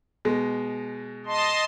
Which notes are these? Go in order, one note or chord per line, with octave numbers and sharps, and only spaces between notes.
B2 G#3
D#5 A5 C6